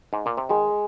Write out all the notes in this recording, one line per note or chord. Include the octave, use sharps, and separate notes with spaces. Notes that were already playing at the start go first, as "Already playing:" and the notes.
G#2
A#2
C3
D#3 G#3